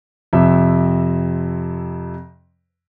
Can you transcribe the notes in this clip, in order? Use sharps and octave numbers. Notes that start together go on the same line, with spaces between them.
F2 C3 E5